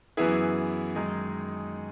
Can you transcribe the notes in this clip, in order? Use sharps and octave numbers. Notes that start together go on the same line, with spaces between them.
F#2 E3 B3 E4 G#4
F#2 D#3 G#3 D#4 G#4